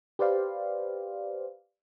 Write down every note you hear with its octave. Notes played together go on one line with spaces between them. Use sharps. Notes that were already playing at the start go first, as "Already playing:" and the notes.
G4 B4 C5 D5 F5